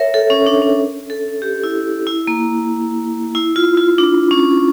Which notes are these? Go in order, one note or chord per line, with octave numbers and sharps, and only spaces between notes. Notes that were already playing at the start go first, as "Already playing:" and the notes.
Already playing: A#4 C#5 E5
A4
C#4
D4
C#4
A4
G4
E4
E4
A#3
E4
F4
F4
D4
C#4